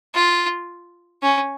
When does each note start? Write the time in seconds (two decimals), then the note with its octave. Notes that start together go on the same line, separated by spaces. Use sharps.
0.15 F4
1.22 C#4